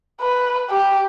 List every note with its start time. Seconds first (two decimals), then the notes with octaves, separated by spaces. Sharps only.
0.21 B4
0.70 G4